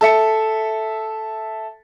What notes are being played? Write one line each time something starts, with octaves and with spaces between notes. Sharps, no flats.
A4 E5 C#7